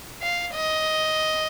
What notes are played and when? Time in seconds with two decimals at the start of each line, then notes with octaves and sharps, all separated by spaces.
0.22 F5
0.54 D#5